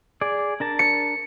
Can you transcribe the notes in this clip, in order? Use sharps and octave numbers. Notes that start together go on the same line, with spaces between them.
G#4 D5
D4 A#4 A5
C#7